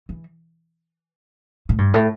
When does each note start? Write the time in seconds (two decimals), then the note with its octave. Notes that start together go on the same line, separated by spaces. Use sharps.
0.09 E3
1.69 A2
1.78 G2
1.94 A2